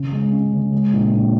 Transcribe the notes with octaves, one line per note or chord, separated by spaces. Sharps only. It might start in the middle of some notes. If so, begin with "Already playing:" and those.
Already playing: C#3
G#3
C#4
C#3
G#3
A#1
A#1